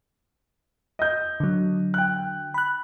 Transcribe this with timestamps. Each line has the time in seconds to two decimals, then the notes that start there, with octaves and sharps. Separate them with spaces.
0.99 D#5 G6
1.40 D3 F#3
1.94 G5 F#6
2.54 B5 F#6